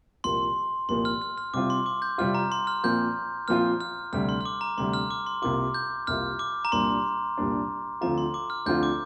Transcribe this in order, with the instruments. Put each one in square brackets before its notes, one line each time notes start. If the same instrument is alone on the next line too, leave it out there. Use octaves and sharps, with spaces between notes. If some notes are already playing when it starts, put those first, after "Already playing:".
[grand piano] C2 A#2 F3 A#3 [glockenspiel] C6
[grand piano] C2 A#2 F3 A#3 [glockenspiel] C6
[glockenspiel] F6
F6
F6
[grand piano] C3 G3 C4 F4 [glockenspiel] D6
[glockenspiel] C6
D6
G6
[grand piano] C3 G3 C4 F4 [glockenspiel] F6
[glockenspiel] A#5
C6
F6
[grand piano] A#2 F3 C4 F4 [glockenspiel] G6
[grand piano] A#2 F3 C4 F4 [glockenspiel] F6
[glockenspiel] F6
[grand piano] D2 C3 G3 [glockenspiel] F6
[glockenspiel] C6
F6
D6
A#5
[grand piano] D2 C3 G3 [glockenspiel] C6
[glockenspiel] F6
D6
C6
[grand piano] C2 C3 A#3 F4 [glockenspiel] D6
[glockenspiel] G6
[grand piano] C2 C3 A#3 F4 [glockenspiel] F6
[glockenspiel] D6
A#5
[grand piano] C2 A#2 G3 D4 [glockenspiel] C6
[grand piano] C2 A#2 G3 D4
[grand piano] D2 D3 F3 C4 F4 [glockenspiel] A#5
[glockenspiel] C6
D6
F6
[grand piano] D2 D3 F3 C4 F4 [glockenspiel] G6
[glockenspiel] D6